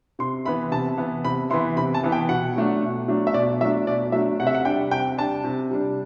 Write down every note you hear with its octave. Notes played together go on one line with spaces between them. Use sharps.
C3 C6
E3 B3 E4 B5
C3 A5
E3 B3 E4
C3 B5
E3 B3 E4 C6
C3 B5
A5
E3 B3 E4
G5
B2 F#5
F#3 A3 D4
B2
F#3 A3 D4
E5
B2 D5
F#3 A3 D4 E5
B2 D5
F#3 A3 D4 E5
C3 F#5
E5
F#5
G3 D4 G5
C3 G5
G3 D4 A5
C3
G3 D4